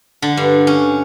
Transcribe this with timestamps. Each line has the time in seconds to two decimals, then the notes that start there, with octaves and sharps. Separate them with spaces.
0.22 D3
0.37 G2
0.67 C#4